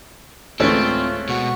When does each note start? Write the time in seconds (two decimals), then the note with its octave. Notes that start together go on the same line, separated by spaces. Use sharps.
0.60 D2 A2 E3 G#3 A3 C4 C#4 F4
1.29 B2 G#3 F#4 C#6